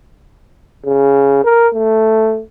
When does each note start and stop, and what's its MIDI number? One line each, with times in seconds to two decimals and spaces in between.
0.86 1.42 49
1.44 1.68 70
1.74 2.41 57